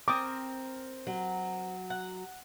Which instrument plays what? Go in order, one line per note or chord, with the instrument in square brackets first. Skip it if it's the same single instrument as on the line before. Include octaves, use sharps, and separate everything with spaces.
[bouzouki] C4 A#4 [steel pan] D6 D#6
[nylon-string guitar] F#3
[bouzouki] F#5